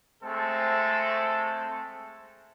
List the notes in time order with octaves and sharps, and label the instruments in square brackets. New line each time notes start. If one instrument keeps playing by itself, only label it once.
[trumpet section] G#3 A3 C4 A4